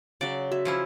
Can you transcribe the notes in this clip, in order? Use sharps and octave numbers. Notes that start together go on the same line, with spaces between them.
C#3 F#3 D5
F#4 E5
F3 C#4 E4